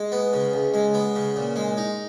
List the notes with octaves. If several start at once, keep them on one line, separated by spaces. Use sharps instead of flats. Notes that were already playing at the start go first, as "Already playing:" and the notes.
Already playing: G#3
B3
C#3
C#2
G#3
B3
C#3
A#2
G#3
D#4